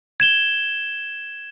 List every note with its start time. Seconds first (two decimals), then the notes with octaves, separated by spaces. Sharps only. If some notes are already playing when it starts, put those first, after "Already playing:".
0.20 G#6 E7 G7